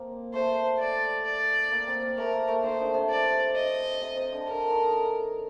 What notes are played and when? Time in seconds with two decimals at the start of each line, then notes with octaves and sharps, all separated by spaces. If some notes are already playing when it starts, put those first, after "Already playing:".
Already playing: A#3 C4
0.33 A3 C5
0.79 D5
1.25 D5
1.71 A#3
1.87 C4
2.02 A#3
2.17 A3 A#4
2.33 A#3
2.48 A3
2.63 D#3 C5
2.79 D3
2.94 C3
3.09 D5
3.55 D#5
4.01 C3
4.17 C3
4.32 D3
4.47 D3 A#4
4.70 D#3